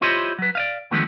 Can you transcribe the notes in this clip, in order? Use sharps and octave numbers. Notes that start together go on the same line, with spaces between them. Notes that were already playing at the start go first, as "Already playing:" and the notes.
E4 F4 G4 C5 C#5 D#5
F#3 B4
D5 D#5 F5
D3 D#3 F3 G#3 A3 B3